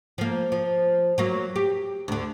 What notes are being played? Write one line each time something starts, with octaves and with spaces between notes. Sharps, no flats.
F3 A#3
F3
F#3 A#3
G4
D2 D3